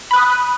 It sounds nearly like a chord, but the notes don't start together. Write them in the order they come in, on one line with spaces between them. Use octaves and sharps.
B5 F#6 D#6